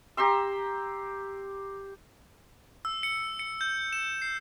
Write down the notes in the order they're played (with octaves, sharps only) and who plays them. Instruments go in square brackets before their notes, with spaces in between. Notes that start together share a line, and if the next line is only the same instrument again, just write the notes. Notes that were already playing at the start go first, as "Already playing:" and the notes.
[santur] G4 A#5 C6 E6
[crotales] E6
C#7
C#7
G6
E7
C7